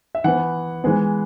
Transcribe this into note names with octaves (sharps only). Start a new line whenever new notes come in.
E5
E3 B3 F#5
E3 G#3 B3